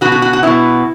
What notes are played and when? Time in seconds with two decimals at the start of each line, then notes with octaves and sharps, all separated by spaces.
0.01 B2 B3 F#4
0.12 F#4
0.22 F#4
0.33 F#4
0.43 B2 B3 E4